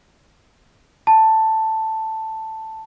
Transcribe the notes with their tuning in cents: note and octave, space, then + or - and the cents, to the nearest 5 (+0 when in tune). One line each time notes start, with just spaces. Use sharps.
A5 +5